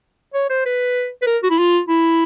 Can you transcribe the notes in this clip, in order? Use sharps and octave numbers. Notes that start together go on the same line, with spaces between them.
C#5
C5
B4
B4
A#4
F#4
E4
F4
E4